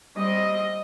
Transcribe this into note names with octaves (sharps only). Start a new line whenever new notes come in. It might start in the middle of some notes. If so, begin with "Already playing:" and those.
G3 C4 D#5